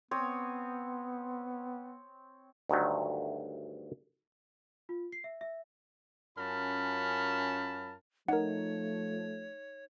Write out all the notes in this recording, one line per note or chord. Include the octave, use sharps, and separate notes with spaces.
B3 C4 C#5 D#6
D2 G2 D#3 F#3 A3
F4
C7
E5
E5
F#2 C#4 F4 A#4 A5 B5
F3 A3 D#4 A#4 C#5 F#5